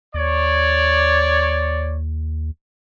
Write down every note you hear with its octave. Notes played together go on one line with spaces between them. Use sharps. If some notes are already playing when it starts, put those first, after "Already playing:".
D#2 C#5 D5